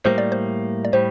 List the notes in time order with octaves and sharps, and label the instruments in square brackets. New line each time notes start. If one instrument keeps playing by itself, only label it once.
[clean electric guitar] A2 G3 A#3 [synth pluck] C5
[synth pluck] D5
C5
D5
[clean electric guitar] A2 G3 [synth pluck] C5